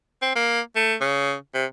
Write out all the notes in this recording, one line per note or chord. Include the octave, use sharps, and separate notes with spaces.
C4
A#3
A3
C#3
C3